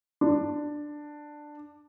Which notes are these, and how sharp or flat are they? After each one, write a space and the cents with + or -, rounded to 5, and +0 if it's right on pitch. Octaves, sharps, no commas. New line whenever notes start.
D4 +10